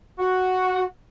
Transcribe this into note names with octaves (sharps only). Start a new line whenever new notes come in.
F#4